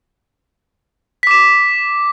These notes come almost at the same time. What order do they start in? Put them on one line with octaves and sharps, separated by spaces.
B6 D6 E7